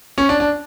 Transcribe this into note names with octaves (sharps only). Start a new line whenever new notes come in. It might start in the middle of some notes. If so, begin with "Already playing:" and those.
C#4
D4
D4